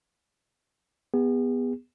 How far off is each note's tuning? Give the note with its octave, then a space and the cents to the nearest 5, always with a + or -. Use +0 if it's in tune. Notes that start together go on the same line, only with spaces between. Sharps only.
B3 +0 G#4 -40